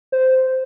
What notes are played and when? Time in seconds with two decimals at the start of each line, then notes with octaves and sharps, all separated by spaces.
0.12 C5